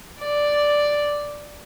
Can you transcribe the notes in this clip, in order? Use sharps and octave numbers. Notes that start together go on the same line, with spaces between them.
D5